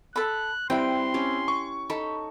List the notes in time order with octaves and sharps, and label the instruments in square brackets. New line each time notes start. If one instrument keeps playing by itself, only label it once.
[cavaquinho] A4 B5 [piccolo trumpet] F#6
[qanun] G3 E4 B4 [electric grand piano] C4 [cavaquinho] G5 [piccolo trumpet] C6
[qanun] C#4 G4
[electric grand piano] C#6
[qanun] D#4 A4 [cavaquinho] B5